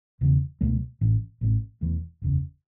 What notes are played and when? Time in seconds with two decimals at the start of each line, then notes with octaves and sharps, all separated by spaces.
0.21 E1 E2 C#3 E3
0.61 C#2 B2 F#3 A3
1.01 A1 A2 E3
1.41 A1 A2 A3 C#4
1.81 E1 E2 E3 A3
2.22 F#1 E2 C#3